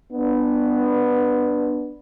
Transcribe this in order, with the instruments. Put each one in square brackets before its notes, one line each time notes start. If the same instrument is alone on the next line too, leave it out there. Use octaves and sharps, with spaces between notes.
[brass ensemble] B3 D4